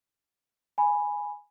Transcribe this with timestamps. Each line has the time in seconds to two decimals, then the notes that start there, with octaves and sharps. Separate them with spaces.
0.78 G#5 B5